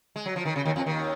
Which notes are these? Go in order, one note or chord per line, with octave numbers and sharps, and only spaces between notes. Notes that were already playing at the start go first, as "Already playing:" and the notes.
G#3
F#3
F3
D#3
C#3
D#2 D#3
F2 F3
D#2 D#3